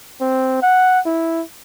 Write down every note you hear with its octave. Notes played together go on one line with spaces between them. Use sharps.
C4
F#5
E4